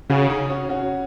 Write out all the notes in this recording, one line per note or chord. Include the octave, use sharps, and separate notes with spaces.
C#3 C#4 F#4
D#4 G#4
C#4 F#4
C#4 F#4